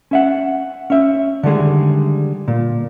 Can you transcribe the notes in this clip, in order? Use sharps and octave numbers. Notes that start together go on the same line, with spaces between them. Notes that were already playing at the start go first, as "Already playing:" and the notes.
C#4 E5 F#5
C#4 E5
D3 D#3 G3 G#3 G#4
A#2